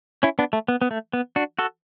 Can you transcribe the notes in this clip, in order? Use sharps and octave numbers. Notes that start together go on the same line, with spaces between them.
C#4 E4
B3 D4
A3
B3
B3
A3
B3
D4 F#4
F#4 A4